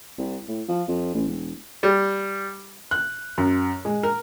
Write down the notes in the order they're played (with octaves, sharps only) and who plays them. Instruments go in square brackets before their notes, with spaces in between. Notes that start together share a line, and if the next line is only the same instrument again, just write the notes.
[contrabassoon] C2
A2
F3
F2
A1
E1
[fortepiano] G3
[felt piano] F#6
F#2
G#3
A#4